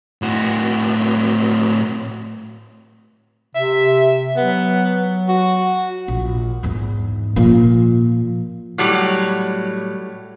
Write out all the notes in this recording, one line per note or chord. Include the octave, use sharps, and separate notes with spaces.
A2 F#4
C3 E5
F#3 B3
F#4
A#1
E2 G#2
A#2 F3
A2 F#3 G3